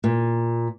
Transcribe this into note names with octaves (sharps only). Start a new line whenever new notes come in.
A#2